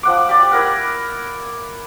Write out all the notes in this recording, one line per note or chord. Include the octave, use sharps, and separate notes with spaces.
F3 F#5 D6
G4 D5
E4 A#4 F#5